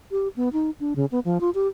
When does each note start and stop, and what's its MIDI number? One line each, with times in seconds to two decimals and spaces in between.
0.11 0.28 67
0.36 0.49 59
0.53 0.70 63
0.80 0.94 62
0.96 1.06 49
1.12 1.20 59
1.25 1.40 53
1.41 1.50 65
1.55 1.68 67